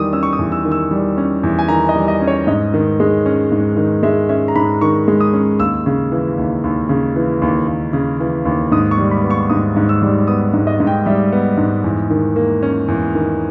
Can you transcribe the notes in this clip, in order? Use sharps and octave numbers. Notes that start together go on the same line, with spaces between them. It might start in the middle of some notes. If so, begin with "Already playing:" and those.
Already playing: E2 D#3 G3 D#6
C#4 E6
C#6
D#6
E2
E6
D#3
E6
G3
C#4
E2
G#5
D#3 A#5
D#5
G3
D#5
C#4
C#5
G#2 D#5
D#3
G#3
C#4
G#2
D#3
G#3 E5
C#4 E5
A#5
G#2 B5
D#3 C#6
G#3
D#6
C#4
D#2 E6
C#3
E3
D#2
D#2
C#3
E3
D#2
D#2
C#3
E3
D#2
G#2 D#6
C#6
G3
B5
B3
C#6
G#2 D#6
G#2
E6
G3
B3 D#6
G#2
D#5
G#2
G5
G3 E5
B3
G#2
E2
D#3
A#3
C#4
E2
D#3